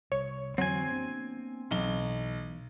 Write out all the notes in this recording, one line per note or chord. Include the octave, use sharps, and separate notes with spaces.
C2 C#5
F2 D3 E3 F#3 C4 G#5
A#3 B3 D4
B1 B2 E3 B3 G7